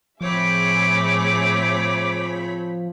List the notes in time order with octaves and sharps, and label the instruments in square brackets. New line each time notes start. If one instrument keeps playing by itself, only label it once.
[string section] A2 G#4 E5 [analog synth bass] F3 [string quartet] C4 C#5 B5 [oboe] D6